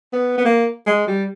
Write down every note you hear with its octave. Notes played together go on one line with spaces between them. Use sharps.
B3
B3
A#3
G#3
G3